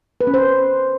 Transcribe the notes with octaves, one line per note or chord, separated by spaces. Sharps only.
B4
C#4
C5